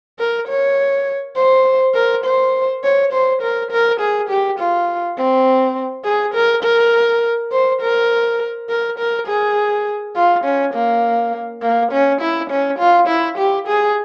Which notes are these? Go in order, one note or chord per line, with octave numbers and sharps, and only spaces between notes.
A#4
C#5
C5
A#4
C5
C#5
C5
A#4
A#4
G#4
G4
F4
C4
G#4
A#4
A#4
C5
A#4
A#4
A#4
G#4
F4
C#4
A#3
A#3
C#4
E4
C#4
F4
E4
G4
G#4